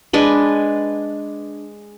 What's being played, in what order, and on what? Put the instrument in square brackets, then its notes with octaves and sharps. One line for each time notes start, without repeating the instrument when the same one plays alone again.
[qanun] G#3 D4 B4